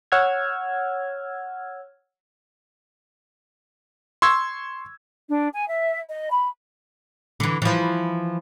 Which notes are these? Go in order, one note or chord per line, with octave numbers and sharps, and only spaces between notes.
C#5 F#5 E6 F6 G#6
C6 C#6 E6 G#6
D4
G#5
E5
D#5
B5
D3 E3
E3 F3